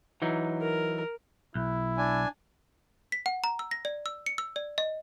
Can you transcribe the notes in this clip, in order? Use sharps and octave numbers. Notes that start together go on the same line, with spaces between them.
E3 F#3 D#4
A#4
B1 E4
D4 G#5
B6
F#5
A#5
E6
A#6
D5
E6
C#7
E6
D5
D#5